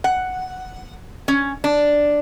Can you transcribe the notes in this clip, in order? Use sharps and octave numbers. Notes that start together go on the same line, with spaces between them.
F#5
C#4
D4